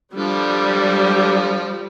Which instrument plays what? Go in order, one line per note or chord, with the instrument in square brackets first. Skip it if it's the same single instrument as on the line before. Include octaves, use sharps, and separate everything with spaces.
[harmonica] D3 F3 [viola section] G3